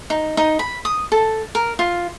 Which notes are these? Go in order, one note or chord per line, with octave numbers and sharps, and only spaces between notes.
D#4
D#4
B5
D#6
A4
A#4
F4